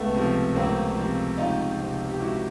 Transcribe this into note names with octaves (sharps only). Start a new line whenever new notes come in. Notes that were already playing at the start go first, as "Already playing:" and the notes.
Already playing: C#2 A3 B3
C3 F3
C#2 A#3 C4
C3 F3
C#2 D#4 F4
C3 F3
G4
C#2 E4 F#4